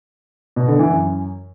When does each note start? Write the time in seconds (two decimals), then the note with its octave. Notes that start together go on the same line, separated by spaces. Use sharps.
0.56 B2
0.68 D3
0.79 E3
0.91 F#2